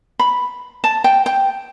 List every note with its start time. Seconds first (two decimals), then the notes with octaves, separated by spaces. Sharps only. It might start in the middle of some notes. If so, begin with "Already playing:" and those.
0.19 B5
0.84 A5
1.04 G5
1.26 G5